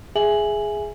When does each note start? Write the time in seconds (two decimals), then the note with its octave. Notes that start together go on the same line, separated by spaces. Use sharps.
0.16 G#4 E5 G#5 F#7